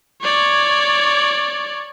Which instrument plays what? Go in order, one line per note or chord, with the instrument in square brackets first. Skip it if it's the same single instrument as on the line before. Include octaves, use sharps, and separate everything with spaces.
[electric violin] C#5 D5